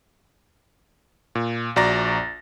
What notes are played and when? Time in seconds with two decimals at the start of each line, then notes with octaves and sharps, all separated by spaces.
1.35 A#2
1.76 A#1 F#4 D5 A#5 A6 A#6